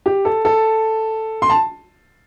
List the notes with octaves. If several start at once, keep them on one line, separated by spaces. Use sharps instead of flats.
G4
A4
A4
C6
A5